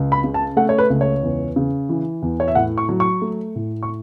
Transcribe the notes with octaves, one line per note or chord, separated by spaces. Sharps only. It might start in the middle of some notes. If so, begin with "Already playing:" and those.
Already playing: C#2
B5
C#3
A5
A3 F#5
C#5
B4
C#2
C#5
E2
C#3
E3
E2
C#5
E5
A2 F#5
C#6
F#3
C#6
A3
A2
C#6